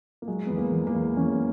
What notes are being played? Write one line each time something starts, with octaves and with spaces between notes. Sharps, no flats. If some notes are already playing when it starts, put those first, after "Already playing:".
A#3
F#3 G#3
E2 B3
A#3
E2
A#3
E2
E2 C#4